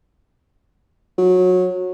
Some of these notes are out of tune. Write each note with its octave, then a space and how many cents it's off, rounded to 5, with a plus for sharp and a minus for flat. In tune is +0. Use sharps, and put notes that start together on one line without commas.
F#3 -20